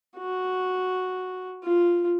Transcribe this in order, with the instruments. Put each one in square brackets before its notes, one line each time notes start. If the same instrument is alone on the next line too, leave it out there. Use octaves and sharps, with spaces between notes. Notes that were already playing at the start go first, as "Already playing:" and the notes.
[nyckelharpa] F#4
F4